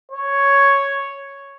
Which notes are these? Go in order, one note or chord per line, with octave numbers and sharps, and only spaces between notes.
C#5